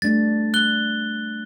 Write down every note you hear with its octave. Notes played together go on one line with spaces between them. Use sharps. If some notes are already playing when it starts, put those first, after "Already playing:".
G3 A3 D4 A6
F#6 G7